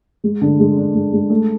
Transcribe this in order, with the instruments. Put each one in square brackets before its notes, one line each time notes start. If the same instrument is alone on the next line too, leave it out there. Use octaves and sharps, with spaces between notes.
[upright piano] G#3
D3
G#3
D4
G#3
G#3
A3